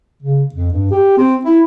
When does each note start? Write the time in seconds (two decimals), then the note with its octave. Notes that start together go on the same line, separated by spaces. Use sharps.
0.23 C#3
0.55 F2
0.72 G2
0.91 G4
1.18 C4
1.45 E4